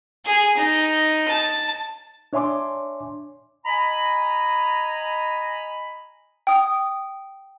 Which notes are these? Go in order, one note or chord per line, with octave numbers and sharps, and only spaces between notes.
G#4
D#4
A5
D4 C#5 E5 G#5 C6 D6
D#5 G#5 A#5 B5
G5 D#6